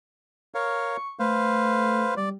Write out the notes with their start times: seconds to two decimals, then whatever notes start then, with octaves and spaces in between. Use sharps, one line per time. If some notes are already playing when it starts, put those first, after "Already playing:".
0.55 A#4 C#5 F5 C#6
1.19 A3 B4 C5 F5
2.17 G3 D5